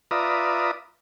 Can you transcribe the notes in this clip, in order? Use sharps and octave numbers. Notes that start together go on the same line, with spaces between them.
F4 B4 D5 E5 A#5 D#6